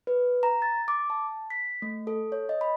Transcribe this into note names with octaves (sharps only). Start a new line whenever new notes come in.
B4
A#5
A6
D6
A5
B6
A3
A4
C#5
D#5
B5